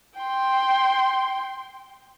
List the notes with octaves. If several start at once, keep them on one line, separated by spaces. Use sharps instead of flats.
G5 C6